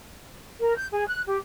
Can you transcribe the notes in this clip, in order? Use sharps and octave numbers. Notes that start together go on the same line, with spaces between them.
A#4
G6
G#4
F#6
G4